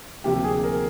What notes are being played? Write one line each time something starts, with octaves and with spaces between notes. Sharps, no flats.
D2 C3 F3 A#3 G4
G#4
A#4